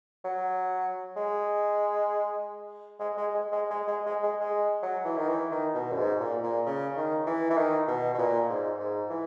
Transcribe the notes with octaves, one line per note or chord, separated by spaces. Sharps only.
F#3
G#3
G#3
G#3
G#3
G#3
G#3
G#3
G#3
G#3
G#3
F#3
E3
D#3
E3
D#3
B2
F#2
G#2
A#2
A#2
C#3
D#3
E3
E3
D#3
B2
B2
A#2
G#2
G#2
E3